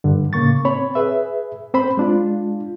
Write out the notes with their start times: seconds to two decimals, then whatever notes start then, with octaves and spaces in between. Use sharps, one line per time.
0.04 G2 D3
0.33 A2 C#3 A#3 C#6 A6
0.65 C4 C#5 B5
0.95 G#4 B4 E5
1.74 C4 C5 B5
1.97 G#3 D4 F4